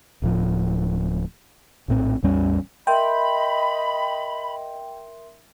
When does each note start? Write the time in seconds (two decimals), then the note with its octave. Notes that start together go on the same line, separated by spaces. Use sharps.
0.22 D1 A2 F3
1.88 A#1 A2 C4
2.23 A1 E2 G3 C#4
2.87 A#4 D#5 E5 G5 B5 C6